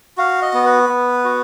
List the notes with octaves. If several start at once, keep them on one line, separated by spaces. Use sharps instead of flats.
F#4 F5
D#5
B3
B4
B3
F#4